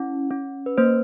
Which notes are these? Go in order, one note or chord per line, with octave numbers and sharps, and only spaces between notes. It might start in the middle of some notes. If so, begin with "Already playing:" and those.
Already playing: C#4 E4
C#4
B4
A#3 C5